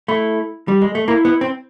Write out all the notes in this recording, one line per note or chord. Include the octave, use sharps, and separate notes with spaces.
A3 E4
G3
G#3
A3
A#3 E4
B3
C4